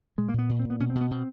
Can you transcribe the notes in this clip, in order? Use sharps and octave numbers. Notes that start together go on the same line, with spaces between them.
A#2 G#3
A#3
A#2 B3
A#2
C4
A#2
B3
B2 C#4
C4
B2
B3
B2 C4